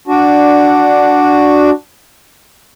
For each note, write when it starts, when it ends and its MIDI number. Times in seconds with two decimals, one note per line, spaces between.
0.08 1.70 62
0.08 1.70 66